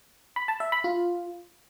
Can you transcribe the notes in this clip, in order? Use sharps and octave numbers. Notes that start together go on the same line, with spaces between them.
B5
A5
E5
B5
F4